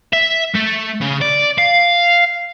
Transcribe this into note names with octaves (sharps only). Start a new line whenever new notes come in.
E5
A3
C#3
D5
F5